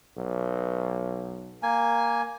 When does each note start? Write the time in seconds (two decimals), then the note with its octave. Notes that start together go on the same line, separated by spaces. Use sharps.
0.17 B1
1.63 A#3 G#5